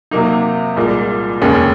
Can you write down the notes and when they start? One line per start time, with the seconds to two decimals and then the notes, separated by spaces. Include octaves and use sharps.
0.11 C3 F#3 A#3 D#4
0.77 C2 A#2 G#3
1.41 F1 D#2 C#3 G#3 C#4